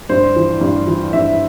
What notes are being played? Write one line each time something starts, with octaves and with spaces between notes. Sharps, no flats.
G2 C5
E3
G2
E3
G2 E5